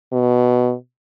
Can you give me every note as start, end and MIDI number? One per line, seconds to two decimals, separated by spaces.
0.13 0.73 47